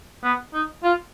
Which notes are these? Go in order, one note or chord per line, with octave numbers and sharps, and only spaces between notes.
B3
D#4
F4